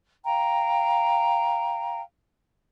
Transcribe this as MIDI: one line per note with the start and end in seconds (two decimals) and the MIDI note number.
0.25 2.00 77
0.25 2.00 79
0.25 2.00 82